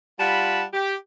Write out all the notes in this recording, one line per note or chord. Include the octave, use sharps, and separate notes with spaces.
G3 F4 F#5 A5 B5
G4